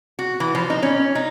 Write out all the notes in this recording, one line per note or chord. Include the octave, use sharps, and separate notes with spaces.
F#4
E3
F3
D#4
C#4
D#4